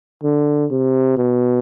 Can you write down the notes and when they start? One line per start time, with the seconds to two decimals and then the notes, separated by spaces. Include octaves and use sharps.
0.23 D3
0.71 C3
1.18 B2